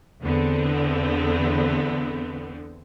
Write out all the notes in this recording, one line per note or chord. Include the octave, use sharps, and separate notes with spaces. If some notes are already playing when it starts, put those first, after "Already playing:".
E2 D3 B3 C4